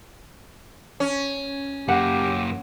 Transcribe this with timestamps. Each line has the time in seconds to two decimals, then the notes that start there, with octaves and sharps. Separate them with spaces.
1.00 C#4
1.88 F#2 A#3 G4 F#5